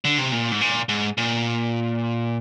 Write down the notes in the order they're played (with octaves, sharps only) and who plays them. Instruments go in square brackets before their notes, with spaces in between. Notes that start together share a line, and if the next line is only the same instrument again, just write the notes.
[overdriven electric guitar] D3
C3
A#2
G#2
A#2
G#2
A#2